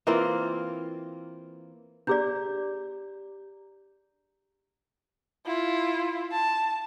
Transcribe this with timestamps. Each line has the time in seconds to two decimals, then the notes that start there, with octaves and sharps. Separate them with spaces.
0.07 E3 A#3 C4 F4
2.07 D4 G4 G#4 D5 A#5 G6
5.46 E4 F4
6.32 A5